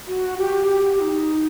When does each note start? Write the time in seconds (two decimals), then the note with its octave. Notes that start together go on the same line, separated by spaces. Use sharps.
0.07 F#4
0.38 G4
0.68 G4
0.98 F#4
1.01 D#4